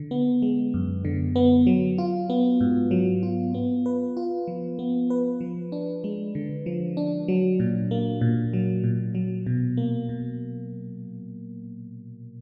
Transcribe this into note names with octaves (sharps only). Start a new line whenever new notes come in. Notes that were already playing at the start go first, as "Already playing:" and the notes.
Already playing: D3
B3
G#3
F#2
D3
B3
F#3
F4
B3
G#2
F#3
F4
B3
B4
F4
F3
B3
B4
F3
D4
G#3
D3
F3
D4
F#3
A#2
A#3
A#2
F#3
A#2
F#3
B2
A#3
B2